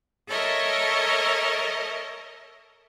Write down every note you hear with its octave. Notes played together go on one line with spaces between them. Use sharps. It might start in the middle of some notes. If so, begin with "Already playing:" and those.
A4 A#4 C#5 D#5 E5